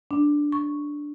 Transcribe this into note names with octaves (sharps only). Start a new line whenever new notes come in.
D4
C#6